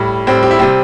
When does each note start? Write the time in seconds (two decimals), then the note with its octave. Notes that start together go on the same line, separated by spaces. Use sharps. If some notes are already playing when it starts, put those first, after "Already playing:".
Already playing: A2 G3
0.27 A2 G3 C4
0.43 G4
0.51 E4
0.59 C3 G3 C4